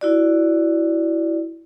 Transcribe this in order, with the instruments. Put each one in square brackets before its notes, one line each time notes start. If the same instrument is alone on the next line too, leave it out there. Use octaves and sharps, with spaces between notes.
[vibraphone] E4 F#4 D5